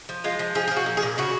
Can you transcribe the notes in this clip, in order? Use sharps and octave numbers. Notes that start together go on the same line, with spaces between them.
F3
G#3 F4
F3
F3 G#4
F3 G#4
F#4
A#2
G#4
A#2
C#3 F#4